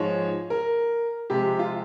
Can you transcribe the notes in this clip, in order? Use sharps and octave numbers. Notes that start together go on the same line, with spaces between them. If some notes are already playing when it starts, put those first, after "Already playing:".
Already playing: G#2 F3 G#3 C#5
A#4
C3 F3 G#3 G4
F4